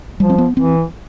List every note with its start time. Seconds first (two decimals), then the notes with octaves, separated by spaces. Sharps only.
0.19 F3 G3
0.30 C4
0.38 B3
0.57 E3 C4